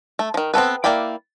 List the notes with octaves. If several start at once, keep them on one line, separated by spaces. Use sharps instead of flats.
A3
D#3 F3
B3 C4 A4 B4
A#3 E4 D5 G5 B5